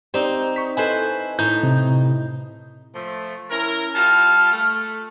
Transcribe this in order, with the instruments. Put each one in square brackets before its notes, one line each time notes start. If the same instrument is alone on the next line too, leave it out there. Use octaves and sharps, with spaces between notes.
[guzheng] C4 D#4 [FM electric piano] G4 D5
[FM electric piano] C#6 B6
[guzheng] E4 B4 C5 [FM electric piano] A4 D#5 G#5
[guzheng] A2 D#4 [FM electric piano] E4 [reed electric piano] G6
[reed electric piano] C3
[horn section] F3 A3
C#4 E4 A#4
[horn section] G3 F4 A5 [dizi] F6
[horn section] A3